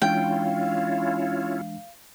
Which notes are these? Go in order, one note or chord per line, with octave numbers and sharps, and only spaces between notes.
E3 G#3 C#4 D4 E4 F4 F5 G5